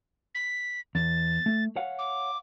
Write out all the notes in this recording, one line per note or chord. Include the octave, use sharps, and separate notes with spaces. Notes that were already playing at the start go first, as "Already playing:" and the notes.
B6
E2 A6
A3
C#5 F5 F#5
D6